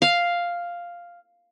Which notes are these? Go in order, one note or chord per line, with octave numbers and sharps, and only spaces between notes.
F5